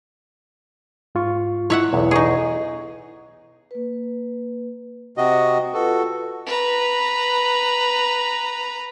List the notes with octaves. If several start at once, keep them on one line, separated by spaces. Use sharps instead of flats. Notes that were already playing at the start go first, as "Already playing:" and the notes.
G#2 F4 C#6
E4 C#5 E5 F#5
B1 E2 B2 B3
D#4 G#4 A#5 C#6
A#3 B4
C3 F#4 D#5 G5
F4 F#4 A4 B4
B4 A#5